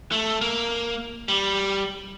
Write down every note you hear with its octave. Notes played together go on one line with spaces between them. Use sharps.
A3
A#3
G3